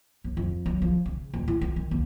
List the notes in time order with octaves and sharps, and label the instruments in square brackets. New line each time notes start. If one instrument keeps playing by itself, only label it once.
[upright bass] D#2
F2
F#3
F3
C#3
D#1
E4
F4
D#3
D#2